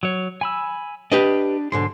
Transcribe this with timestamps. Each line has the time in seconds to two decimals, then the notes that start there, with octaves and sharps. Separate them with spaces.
0.03 F#3 C#5
0.41 G#5 B5 E6
1.12 D4 G4 B4 D#5
1.72 B1 G#2 D3 C6